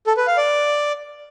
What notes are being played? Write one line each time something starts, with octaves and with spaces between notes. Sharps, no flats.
A4
B4
F5
D5